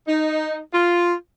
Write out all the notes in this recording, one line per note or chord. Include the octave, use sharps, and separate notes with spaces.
D#4
F4